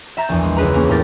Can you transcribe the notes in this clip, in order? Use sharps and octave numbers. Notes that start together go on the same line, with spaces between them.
E5 A#5 G6 A6
A#1 E2
G#3
C#2 G#4 B4 A#5
A#3 C#4
A2 G4 A#4 A6